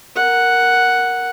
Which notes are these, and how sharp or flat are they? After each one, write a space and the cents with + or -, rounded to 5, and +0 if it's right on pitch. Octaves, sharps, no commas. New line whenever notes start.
A#4 +0 F#5 +0